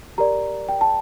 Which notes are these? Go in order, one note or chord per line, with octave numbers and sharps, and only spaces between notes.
G4 A#4 D5 A#5
G5
A5